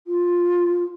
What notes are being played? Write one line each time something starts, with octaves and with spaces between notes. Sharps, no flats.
F4